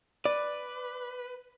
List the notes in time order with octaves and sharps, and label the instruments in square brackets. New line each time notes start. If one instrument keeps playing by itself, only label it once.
[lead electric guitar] B4 [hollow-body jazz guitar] D5